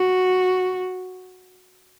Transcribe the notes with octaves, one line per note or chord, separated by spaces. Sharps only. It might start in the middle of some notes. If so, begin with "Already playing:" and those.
Already playing: F#4